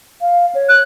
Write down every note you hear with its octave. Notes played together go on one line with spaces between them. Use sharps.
F5
C#5
F#6